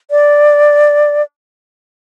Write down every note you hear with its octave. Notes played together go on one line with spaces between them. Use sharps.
D5